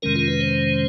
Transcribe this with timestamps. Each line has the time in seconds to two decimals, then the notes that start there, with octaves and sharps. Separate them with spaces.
0.02 F2 C3 D#3 G#3 C#4 A#4
0.16 F4
0.28 B4
0.40 C5